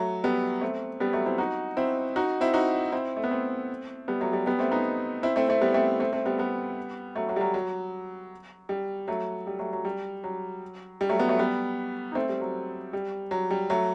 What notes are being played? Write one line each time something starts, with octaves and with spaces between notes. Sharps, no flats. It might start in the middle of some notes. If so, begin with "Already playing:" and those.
Already playing: F#3 A3
G3 B3
A3 C4
G3 B3
F#3 A3
C4 E4
D#4 F#4
C4 E4
D#4 F#4
C4 E4
D#4 F#4
C4 E4
A3
B3
A3 C4
G3 B3
F#3 A3
G3
G3 B3
A3 C4
B3 D#4
C4 E4
A3 C4
A3 C4
G3 B3
A3 C4
A3 C4
A3 C4
G3 B3
G3 B3
F#3 A3
F#3 A3
G3
F#3
F#3
G3
F#3 A3
G3
F#3 A3
F#3
G3
F#3
G3
F#3 A3
G3 B3
F#3 A3
G3 B3
D#4
A3 C4
G3
F#3
G3
F#3
G3
F#3 A3